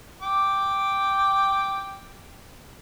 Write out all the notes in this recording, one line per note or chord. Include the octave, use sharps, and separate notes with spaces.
G5 D6